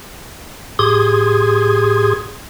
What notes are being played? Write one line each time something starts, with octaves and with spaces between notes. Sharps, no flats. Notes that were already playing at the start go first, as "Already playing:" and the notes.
A2 G4 G#4 C6 D#6 G#6